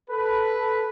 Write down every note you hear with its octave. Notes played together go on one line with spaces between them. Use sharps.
A4 B4